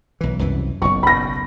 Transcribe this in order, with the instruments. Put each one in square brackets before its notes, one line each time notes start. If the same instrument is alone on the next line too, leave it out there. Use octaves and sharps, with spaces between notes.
[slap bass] B1 E3
C2 F#2 E3
[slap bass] F#1 B1 [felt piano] C#6
[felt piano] B5 A#6